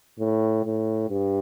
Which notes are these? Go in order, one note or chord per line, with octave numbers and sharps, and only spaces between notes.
A2
A2
G2